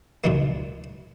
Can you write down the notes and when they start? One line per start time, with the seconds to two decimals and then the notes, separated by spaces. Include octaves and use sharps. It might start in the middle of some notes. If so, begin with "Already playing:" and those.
0.24 C#2 F#2 A#2 D#3 E3 A#3